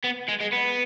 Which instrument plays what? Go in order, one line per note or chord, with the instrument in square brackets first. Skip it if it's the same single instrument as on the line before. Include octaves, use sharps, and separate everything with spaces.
[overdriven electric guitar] B3
G#3
G#3
B3